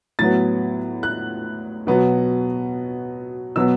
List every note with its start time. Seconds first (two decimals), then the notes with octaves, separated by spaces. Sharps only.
0.19 A2 F#3 B3 A6
1.03 F#6
1.87 B2 F#3 B3
3.56 B2 F#3 B3 E6